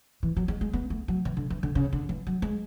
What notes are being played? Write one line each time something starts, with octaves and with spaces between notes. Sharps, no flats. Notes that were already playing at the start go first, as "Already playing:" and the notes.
E3
F#3
G#3
G#3
B3
A3
F#3
E3
D3
E3
D3
C#3
D3
E3
F#3
G#3